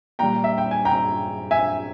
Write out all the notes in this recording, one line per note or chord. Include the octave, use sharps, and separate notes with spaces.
A#2 G3 G5 A#5
E5
G5
G#5
G5 A#5
E5 G#5